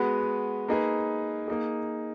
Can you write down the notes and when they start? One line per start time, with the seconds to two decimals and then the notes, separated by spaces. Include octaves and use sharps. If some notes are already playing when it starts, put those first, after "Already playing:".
Already playing: G#3 B3 F#4 B4
0.68 A#3 D#4 G#4 B4
1.48 A#3 D#4 G#4